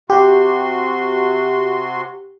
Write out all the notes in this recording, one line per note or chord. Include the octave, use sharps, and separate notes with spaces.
C3 F#4 G4 C6